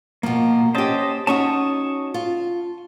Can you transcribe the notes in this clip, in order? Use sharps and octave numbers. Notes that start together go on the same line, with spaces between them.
B2 F3 A#3
C#4 G4 C5 D#5 A5
C#4 D#4 F#4 A5 C#6 D#6
F4